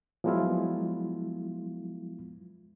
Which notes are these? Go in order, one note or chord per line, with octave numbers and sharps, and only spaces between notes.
F3 F#3 G#3 B3 E4 F4